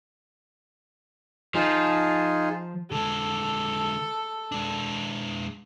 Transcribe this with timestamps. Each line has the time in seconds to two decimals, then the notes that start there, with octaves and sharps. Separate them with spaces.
1.55 F3 D#4 F4 G#4
2.92 D3 G#3 A4
4.52 G#3 D4